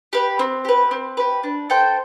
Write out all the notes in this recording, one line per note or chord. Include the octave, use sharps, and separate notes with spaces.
G4 B4
C4
G4 B4
C4
G4 B4
D4
A4 C5 G5